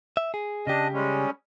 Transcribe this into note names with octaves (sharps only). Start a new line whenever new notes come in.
E5
G#4
C#3 D4 G4 D#5
G3 G#3 C#4